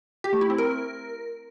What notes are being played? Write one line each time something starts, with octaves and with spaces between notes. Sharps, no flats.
G4
A3
E4
C4
A#4